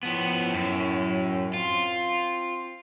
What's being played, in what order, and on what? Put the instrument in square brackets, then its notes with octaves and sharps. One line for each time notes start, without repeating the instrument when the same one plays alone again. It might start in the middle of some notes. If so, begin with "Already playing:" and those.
[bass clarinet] A2 [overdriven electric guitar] F3 B3
[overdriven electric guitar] F#2
[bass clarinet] C4 [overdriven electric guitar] F4